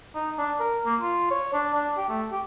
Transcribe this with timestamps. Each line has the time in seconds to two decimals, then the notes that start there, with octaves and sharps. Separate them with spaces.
0.15 D#4
0.38 D4
0.60 A#4
0.86 A#3
1.01 F4
1.31 C#5
1.53 D4
1.74 D4
1.97 G4
2.09 A3
2.32 G4